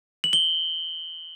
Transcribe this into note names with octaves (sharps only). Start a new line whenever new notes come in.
F#7
G7